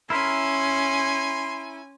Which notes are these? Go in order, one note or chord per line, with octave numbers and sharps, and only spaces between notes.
C#4 E4 A#4 G#5 B5 C6